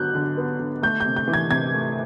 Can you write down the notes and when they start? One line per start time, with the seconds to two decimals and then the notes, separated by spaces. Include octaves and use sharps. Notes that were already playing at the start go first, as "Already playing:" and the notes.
Already playing: D3 F#3 B3 F#6 G6
0.15 D3
0.37 B3
0.60 D3
0.82 A3 G6
1.00 G6
1.06 C3
1.16 G6
1.28 E3
1.34 G#6
1.51 C3 G#6
1.74 A3